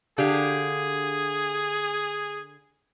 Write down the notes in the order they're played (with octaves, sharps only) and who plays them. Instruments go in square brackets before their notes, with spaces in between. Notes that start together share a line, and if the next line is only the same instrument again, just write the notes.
[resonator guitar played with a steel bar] D3 G4 F5 [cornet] G#4